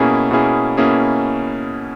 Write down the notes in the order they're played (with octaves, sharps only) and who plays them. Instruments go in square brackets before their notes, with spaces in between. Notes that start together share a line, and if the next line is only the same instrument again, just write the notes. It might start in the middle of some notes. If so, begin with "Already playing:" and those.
Already playing: [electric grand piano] B2 A#3 C#4 E4 G#4
B2 A#3 C#4 E4 G#4
B2 A#3 C#4 E4 G#4